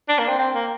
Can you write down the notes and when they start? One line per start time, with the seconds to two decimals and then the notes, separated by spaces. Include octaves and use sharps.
0.09 D4
0.19 A#3
0.29 C4
0.39 C4
0.55 A#3